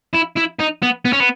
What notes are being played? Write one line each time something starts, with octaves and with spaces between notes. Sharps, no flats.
E4
E4
D#4
B3
B3
C#4
B3